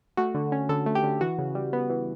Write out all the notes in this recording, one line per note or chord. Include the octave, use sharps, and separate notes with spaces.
A3 F#4
D3
C#4
D3 A4
A3
G4
D3
E3 F#4
C#3
G3
B3
E3